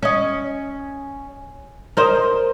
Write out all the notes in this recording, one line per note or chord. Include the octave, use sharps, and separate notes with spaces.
C#4 D#5
A#4 C5 D#5